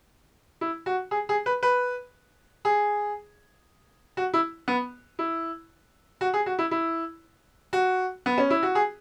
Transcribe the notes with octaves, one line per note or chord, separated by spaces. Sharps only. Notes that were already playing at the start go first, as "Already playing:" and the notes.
E4
F#4
G#4
G#4
B4
B4
G#4
F#4
E4
B3
E4
F#4
G#4
F#4
E4
E4
F#4
B3
C#4
E4
F#4
G#4